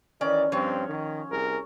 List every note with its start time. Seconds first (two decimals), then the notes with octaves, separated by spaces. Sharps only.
0.21 D#3 E3 C#4 D#4 D5
0.52 G2 F3 C4 C#5
0.88 D#3
1.30 C2 G#4 A#4